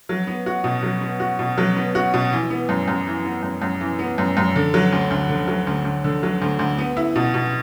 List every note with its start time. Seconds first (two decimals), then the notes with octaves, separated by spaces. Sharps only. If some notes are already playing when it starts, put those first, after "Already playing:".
0.09 F#3
0.27 B3
0.46 F#4
0.64 B2
0.83 F#3
1.01 B3
1.20 F#4
1.39 B2
1.58 F#3
1.76 B3
1.95 F#4
2.14 B2
2.32 E3
2.50 B3
2.69 F#2
2.88 F#2
3.07 E3
3.25 B3
3.43 F#2
3.62 F#2
3.81 E3
3.99 B3
4.18 F#2
4.37 F#2
4.56 D3
4.74 F#3
4.93 D2
5.11 D2
5.29 D3
5.48 F#3
5.67 D2
5.85 D2
6.04 D3
6.23 F#3
6.42 D2
6.59 D2
6.78 B3
6.97 E4
7.16 B2
7.34 B2